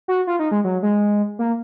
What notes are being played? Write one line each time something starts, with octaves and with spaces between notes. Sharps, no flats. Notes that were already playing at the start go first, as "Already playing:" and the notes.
F#4
F4
D#4
G#3
F#3
G#3
A#3